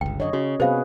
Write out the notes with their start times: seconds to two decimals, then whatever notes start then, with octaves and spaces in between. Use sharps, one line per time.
0.01 G1 C#2 G5
0.20 F#2 D3 C#5 D#5
0.33 C#3 C#4 F#4
0.60 C3 B3 F#4 G#4 B4 C5 F5